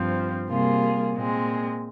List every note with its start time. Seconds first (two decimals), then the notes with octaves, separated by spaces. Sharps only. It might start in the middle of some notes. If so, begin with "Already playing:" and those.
Already playing: G2 F3 C4
0.48 C3 G3 A#3 F4 G#4
1.14 A#2 G#3 C4